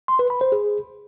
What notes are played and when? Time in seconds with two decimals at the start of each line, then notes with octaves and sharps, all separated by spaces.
0.08 C6
0.19 B4
0.30 B5
0.41 C5
0.52 G#4